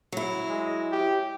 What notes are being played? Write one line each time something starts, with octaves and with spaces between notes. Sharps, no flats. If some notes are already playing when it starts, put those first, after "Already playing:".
F#3 E4
G#3
G4